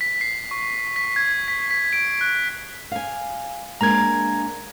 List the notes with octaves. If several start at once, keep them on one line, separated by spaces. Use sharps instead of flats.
B6
C7
C#6
B6
G#6
B6
B6
D7
F#6
F5 G#5
G#3 A#3 D4 A#5 G#6